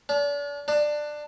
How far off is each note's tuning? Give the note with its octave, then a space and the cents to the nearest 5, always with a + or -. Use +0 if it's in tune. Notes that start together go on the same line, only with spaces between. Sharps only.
D4 -40
D4 +15